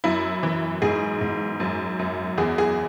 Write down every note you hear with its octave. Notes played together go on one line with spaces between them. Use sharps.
F#2 E4
E3
G#2 G#4
G#2
F#2
F#2
E2 G#4
G#4